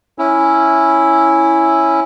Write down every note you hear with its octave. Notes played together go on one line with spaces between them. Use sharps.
C#4 E4